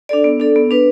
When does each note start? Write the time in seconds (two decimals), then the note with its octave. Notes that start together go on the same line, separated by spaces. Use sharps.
0.09 D4 A4 D5
0.24 B3
0.40 D4 A4 D5
0.56 B3
0.71 D4 B4